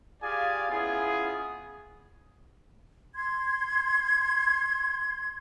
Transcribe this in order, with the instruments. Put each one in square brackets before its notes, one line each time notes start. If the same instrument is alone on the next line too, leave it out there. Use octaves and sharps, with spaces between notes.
[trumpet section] F4 G4 G#4 D5 F5 G#5
B3 C#4 E4 F4 G#4
[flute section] C6 G#6